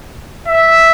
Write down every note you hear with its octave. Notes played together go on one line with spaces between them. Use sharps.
E5